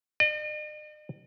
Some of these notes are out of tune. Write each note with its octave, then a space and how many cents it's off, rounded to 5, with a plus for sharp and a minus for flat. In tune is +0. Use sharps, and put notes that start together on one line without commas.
D#5 -45